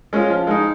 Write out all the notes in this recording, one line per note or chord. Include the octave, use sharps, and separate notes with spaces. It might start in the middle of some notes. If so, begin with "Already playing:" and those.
G#3 C#4 F4
F3
G#3 D#4